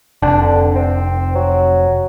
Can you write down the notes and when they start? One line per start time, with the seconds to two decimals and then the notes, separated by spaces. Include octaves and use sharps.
0.22 F1 D4
0.41 D3
0.76 C4
1.35 F#3